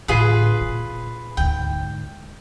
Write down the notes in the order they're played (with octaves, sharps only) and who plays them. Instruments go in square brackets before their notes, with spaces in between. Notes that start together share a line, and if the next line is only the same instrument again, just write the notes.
[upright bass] A2 D3 [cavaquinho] F4 G#4 B4
[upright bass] A#2
[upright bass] D2 G#2 [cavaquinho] G5